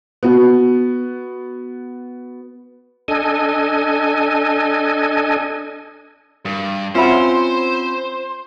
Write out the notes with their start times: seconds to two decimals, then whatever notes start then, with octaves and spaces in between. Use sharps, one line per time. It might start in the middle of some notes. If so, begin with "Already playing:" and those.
0.23 B3 F#4
3.08 D4 A4 D#5 G#5
6.45 G2 A#4
6.95 C4 C#4 F4 B4 C5 E5 F#5 B5